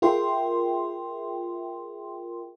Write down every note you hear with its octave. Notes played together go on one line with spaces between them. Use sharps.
F4 G#4 A#4 E5 G5 C6